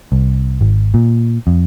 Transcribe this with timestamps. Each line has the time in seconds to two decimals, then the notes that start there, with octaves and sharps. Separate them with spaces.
0.12 C2
0.61 G#1
0.94 A#2
1.47 F2